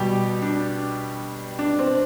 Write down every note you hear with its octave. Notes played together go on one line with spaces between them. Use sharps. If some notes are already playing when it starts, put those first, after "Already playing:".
Already playing: B2 G3 G4
D4
D4
C4